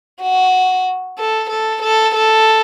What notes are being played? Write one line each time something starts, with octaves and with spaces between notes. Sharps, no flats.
F#4
A4
A4
A4
A4